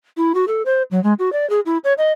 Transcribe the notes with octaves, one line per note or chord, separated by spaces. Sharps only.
E4
F#4
A4
C5
F#3
G#3
F#4
D5
G#4
E4
C#5
D#5